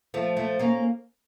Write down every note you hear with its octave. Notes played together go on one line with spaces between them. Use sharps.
F3 A3
F3 A3
A#3 C#4